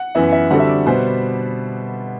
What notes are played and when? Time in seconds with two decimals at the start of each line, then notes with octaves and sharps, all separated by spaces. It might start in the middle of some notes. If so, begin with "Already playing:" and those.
Already playing: F#5
0.15 F#2 E3 B3 E5
0.32 E5
0.50 D3 G3 C4 F#4 A4 F#5
0.60 E5
0.69 D5
0.86 B2 G3 B3 C5